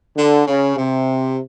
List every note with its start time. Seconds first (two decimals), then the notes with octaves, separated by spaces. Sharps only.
0.17 D3
0.47 C#3
0.76 C3